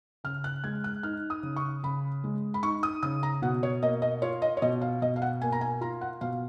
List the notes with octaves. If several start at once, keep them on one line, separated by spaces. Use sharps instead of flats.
C#3 F6
F#6
G#3 G#6
F#6
D#4 F6
D#6
C#3
C#6
C#3 B5
G#3
B5
D#4 C#6
D#6
C#3 D#6
A#5
B2 F#5
C#5
A#3 D#5
D#5
F4 C#5
D#5
C#5
B2 D#5
F5
B2 D#5
F5
F#5
A#3 G#5
A#5
G#5
F4 A#5
F#5
B2 F5